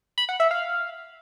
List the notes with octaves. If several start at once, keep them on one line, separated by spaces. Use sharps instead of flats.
B5
F#5
E5
F5